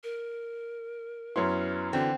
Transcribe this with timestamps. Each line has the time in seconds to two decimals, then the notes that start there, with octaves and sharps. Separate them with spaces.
0.03 A#4
1.36 F#2 B3 E4 C#5 C6
1.93 D3 E3 C4 F#4